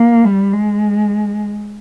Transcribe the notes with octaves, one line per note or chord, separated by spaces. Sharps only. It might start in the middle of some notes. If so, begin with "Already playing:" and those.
Already playing: A#3
G3
G#3